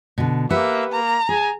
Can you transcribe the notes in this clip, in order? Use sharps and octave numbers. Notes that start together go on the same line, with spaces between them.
B2 D3
A#3 G4 B4 E5 F#5
A#3 A#5
G#4 G#5